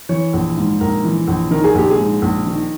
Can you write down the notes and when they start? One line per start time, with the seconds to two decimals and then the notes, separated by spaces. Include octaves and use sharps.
0.09 E3 C#5
0.33 A#1
0.57 G#2
0.80 A#1 A#4
1.04 E3
1.28 A#1
1.51 D#3 A#4
1.64 G#4
1.75 A#1 G4
1.90 G#4
1.98 G#2
2.22 A#1
2.46 D#3